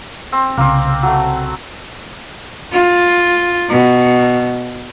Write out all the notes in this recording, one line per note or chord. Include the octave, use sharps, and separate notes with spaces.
C4
C2 C#3 A#3 C4
F#3 A3
F4
B2